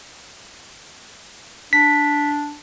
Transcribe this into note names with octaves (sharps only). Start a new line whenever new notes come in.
D4 B6